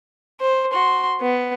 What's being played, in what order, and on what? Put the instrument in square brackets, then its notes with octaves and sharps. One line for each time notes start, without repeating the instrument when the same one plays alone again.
[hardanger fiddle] C5
F#4 C6
B3